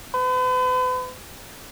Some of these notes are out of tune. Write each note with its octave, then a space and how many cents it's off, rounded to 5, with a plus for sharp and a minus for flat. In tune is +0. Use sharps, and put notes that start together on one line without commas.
B4 +40